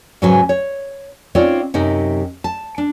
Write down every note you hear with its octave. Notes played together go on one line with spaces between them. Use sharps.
G#2 C#3 F#3 B4 G#5
C#5
C4 C#4 D#4 F4 C#5 D5
F#2 C3 D#4
A5
D4